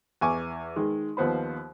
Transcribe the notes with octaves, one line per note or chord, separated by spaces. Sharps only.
E2 G#5 C#6 D6
D#3 G#3
D#2 F3 B3 C5 B5